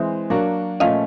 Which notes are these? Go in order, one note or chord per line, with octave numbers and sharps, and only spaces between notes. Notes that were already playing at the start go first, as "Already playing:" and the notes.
Already playing: E3 G#3 C4 E5
F#3 A#3 D4 F#4
A#2 F3 A3 C#4 D#5 F5